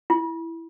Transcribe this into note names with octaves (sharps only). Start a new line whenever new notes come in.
E4